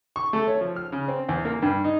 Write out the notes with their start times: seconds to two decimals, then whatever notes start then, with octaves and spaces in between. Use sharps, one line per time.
0.16 C#6
0.33 A3
0.48 C#5
0.61 F3
0.76 F6
0.92 C#3
1.08 C4
1.29 E2
1.45 A#3
1.62 G2
1.84 D#4